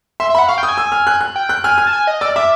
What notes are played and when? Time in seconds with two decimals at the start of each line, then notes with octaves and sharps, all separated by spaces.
0.20 E5 C6
0.30 E5
0.35 F#5 B5
0.48 F5 C#6
0.58 G5
0.63 D#6
0.69 G#5
0.78 E6
0.92 F6
1.07 F#6
1.21 F#6
1.36 G5
1.49 F#6
1.64 G#5 F6
1.78 F6
1.87 A5
1.93 G#5
2.07 D#5
2.21 D5 E6
2.36 E5 D6